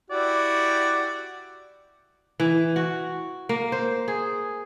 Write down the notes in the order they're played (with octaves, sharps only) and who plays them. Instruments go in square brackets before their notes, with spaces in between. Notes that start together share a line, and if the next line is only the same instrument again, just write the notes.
[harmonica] E4 F#4 G4 [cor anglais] D5
[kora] E3
F#4
A#3
C5
G#4